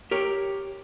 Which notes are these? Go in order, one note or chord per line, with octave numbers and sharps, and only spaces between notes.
G4 A#4 C#5